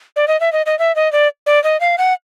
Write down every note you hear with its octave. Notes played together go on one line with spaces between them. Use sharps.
D5
D#5
E5
D#5
D#5
E5
D#5
D5
D5
D#5
F5
F#5